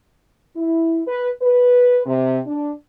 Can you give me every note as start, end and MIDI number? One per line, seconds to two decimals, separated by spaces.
0.56 1.01 64
1.07 1.29 71
1.42 2.01 71
2.06 2.39 48
2.47 2.71 62